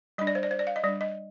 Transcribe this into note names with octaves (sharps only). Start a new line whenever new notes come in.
G3 D4 D#5
D5
C5
D5
C5
D5
F5
D#5
G3 D4 D5
D#5